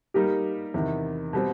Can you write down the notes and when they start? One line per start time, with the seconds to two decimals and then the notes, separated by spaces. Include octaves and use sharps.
0.14 G3 A#3 D#4 G4 A#4
0.74 E2 C3 D#3
1.33 B2 G3 C4